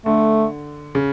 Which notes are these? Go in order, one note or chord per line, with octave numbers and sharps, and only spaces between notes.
D3 A3
C#3